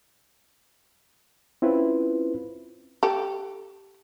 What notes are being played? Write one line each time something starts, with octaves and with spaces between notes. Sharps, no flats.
C4 C#4 E4 F4 B4 C5
G4 A4